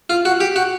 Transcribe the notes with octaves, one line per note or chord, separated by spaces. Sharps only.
F4
F#4
G4
F#4